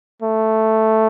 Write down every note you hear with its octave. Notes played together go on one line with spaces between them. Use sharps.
A3